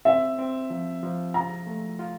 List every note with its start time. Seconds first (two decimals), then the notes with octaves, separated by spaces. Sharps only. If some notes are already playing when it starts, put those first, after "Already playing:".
0.05 C4 E5
0.39 C4
0.70 F3
1.03 F3
1.34 F4 A#5
1.67 A3
1.99 F4